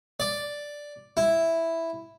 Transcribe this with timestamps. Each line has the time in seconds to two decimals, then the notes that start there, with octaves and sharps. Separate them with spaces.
0.20 D5
1.17 E4